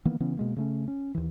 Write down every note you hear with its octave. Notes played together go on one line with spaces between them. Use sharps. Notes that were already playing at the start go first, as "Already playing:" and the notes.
D#3 E3 A#3 B3
C#3 E3 B3 C#4
B2 G#3 A#3
C#3 A3 C#4
C#4
D#2 E3